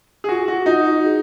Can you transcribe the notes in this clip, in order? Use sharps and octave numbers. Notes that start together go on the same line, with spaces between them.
G#4
F4 F#4
F#4
D#4 F4
F#4
G#4